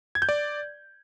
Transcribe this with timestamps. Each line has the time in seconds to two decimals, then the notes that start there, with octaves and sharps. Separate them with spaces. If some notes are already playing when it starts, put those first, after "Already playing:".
0.15 G#6
0.22 G6
0.29 D5